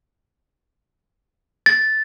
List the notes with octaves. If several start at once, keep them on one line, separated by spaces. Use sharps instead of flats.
A6